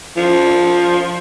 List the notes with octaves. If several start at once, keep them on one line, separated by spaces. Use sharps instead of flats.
F3